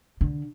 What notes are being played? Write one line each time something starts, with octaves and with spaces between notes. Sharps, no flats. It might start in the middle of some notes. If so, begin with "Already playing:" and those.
D3